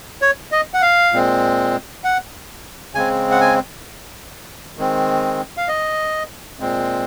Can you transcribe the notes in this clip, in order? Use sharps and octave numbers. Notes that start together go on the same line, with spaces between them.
C#5
D#5
F#5
F5
A#2 G#3 C4
F#5
C#3 G#3 C4 G#5
F#5
G#5
D#3 G#3 C4
F5
D#5
A#2 G#3 C4